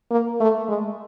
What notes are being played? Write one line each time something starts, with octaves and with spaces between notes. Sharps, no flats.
A#3
A3
G#3